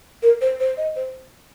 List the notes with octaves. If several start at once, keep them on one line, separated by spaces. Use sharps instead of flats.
A#4
C5
C5
D#5
C5